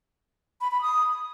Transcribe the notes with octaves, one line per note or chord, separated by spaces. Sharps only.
B5
B5
D#6